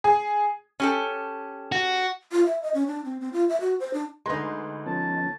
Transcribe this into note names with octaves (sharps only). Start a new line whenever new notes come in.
G#4
C#4 G4 A4
F#4
F4
E5
D#5
C#4
D4
C4
C4
F4
E5
F#4
C5
D4
D2 G#3 D#4 B4 C6
F3 B3 C#4 A5